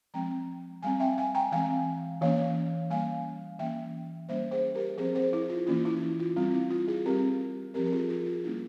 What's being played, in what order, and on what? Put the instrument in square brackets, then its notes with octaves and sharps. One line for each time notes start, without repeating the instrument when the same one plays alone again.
[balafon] F3 G#3 C4 G5 A#5
G3 C4 F5 G#5
E5 G5
F5 G#5
G5 A#5
E3 G#3 C4 F5 G#5
E3 A#3 C#4 C#5 F5
G3 A#3 C#4 F5 G#5
E3 A#3 C#4 E5 G5
G3 A#3 C#4 C5 E5
G#4 C5
G4 A#4
F3 C4 G#4 C5
G#4 C5
E4
F4
E3 A#3 C#4 F4
E4
E4
F4
G3 C4 F4
E4
F4
F4 G#4
G3 C4 G4 A#4
F3 C4 G4 A#4
A#4
F4 G#4
F4 G#4
F4
G3 A#3 C#4 E4